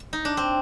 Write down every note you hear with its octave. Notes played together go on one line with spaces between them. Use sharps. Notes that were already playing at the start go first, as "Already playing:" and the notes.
Already playing: F4
D#4
D4
C4